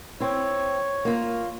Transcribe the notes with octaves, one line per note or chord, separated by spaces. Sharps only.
C4 E4 C#5
A#3 F4